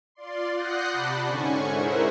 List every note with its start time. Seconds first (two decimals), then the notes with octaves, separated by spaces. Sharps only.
0.15 F4 D5 C6
0.55 F#5 D#6 F#6 G6 A#6 C7
0.89 C3 D5 A5 B5
1.24 G#2 D3 C#4 G#5 C#6
1.70 E4 G#4 A#4 C5 E5 F#5